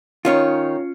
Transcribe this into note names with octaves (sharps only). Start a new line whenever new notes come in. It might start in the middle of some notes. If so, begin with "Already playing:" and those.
D#3 C#4 D#4 F4 C#5